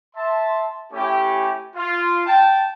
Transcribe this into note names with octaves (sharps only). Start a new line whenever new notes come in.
E5 A5 C6
A3 C#4 E4 G4
F4
G5 A5